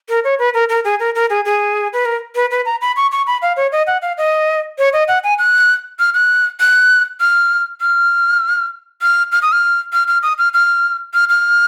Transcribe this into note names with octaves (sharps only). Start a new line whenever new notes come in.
A#4
C#5
B4
A#4
A#4
G#4
A#4
A#4
G#4
G#4
B4
A#4
B4
B4
A#5
B5
C#6
C#6
B5
F5
C#5
D#5
F#5
F5
D#5
C#5
D#5
F#5
G#5
F#6
F6
F#6
F#6
F6
F6
F6
F6
D#6
F6
F6
F6
D#6
F6
F6
F6
F6